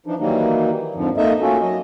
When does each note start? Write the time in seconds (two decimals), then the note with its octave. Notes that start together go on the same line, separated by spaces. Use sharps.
0.06 E3 F3 D4 D#4
0.19 D#3 E3 F#3 G3 A#3 D#4
0.95 F2 G#2 D3 F3
1.17 A#3 D#4 A4 D#5 E5
1.41 A3 A#3 C#4 F4 F#4 A4
1.61 F#3 D#5